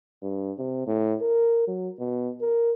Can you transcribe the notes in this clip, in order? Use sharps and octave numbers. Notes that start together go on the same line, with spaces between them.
G2
C3
A2
A#4
F#3
B2
A#4